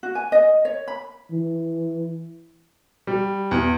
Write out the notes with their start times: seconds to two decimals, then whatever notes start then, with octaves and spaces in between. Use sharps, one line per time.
0.03 F#4
0.15 G#5
0.32 D#5
0.65 C#5
0.88 B5
1.31 E3
3.07 G3
3.51 E2